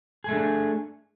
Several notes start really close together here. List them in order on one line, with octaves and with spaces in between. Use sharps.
G#4 A3 D4